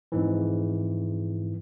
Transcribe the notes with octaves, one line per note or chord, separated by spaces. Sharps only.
F2 G#2 E3